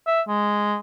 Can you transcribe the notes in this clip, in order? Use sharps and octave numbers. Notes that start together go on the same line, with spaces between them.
E5
G#3